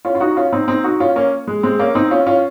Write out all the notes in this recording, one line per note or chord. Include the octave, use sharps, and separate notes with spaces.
C#4 F4
F4
D#4 F#4
C#4 F4
C4 D#4
C4 D#4
D#4 F#4
C#4 F4
A#3 C#4
G#3
G#3 C4
A#3 C#4
C4 D#4
C#4 F4
C#4 F4